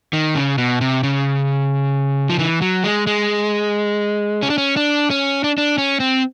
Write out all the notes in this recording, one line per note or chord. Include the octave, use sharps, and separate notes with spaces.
D#3
C#3
B2
C3
C#3
F3
E3
F#3
G#3
G#3
C#4
D4
C#4
D4
C#4
D4
D4
C#4
C4